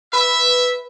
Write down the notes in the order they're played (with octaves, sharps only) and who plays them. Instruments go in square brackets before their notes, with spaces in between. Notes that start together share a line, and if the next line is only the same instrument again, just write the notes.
[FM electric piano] B4 [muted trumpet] E5